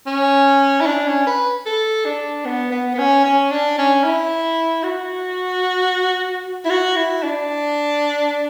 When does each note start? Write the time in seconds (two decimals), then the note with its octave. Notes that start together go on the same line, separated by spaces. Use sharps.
0.07 C#4
0.81 E4
0.86 D4
1.06 C#4
1.27 B4
1.66 A4
2.05 D4
2.45 B3
2.71 B3
2.94 B3
2.98 C#4
3.25 C#4
3.51 D4
3.78 C#4
4.04 E4
4.83 F#4
6.65 E4
6.70 F#4
6.96 E4
7.23 D4